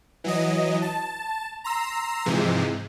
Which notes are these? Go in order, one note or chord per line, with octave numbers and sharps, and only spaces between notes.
E3 F#3 D#5
A5
A#5 C6 E6
G#2 C3 E3 F3 G#3